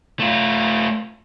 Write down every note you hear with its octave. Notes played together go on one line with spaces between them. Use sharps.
A3 F4